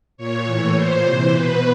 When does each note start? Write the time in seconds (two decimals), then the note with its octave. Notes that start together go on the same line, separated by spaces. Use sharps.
0.17 A#2 C#5
0.46 A2 E3
0.75 A#2 C5
1.03 C3 E3 C5
1.32 B2 B4